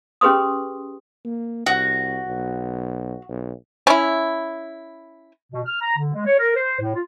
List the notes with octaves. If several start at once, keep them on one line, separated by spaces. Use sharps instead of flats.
C#4 G4 G#4 B4 C6 D#6
A#3
C2 F#4
B1
B1
C#4 E4
B2
F6
A#5
D3
G#3
C#5
A#4
C5
A2
F4